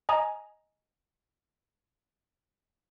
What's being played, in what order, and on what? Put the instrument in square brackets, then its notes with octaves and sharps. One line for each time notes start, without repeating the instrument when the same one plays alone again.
[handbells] D#5 G#5 A#5 D#6